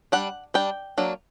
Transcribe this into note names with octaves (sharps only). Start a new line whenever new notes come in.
G3 D4 F#5
G3 D4 G5
F#3 A#3 D4